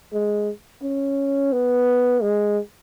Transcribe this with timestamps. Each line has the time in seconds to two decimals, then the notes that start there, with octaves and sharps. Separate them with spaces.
0.13 G#3
0.82 C#4
1.52 B3
2.22 G#3